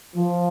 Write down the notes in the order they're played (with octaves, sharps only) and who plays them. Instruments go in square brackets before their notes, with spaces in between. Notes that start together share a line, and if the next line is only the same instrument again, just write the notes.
[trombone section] F3